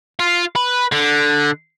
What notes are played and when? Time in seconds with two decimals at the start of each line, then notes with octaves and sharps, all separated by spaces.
0.20 F4
0.56 B4
0.92 D3